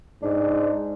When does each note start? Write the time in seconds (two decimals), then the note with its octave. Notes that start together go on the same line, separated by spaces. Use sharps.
0.22 G#2 D4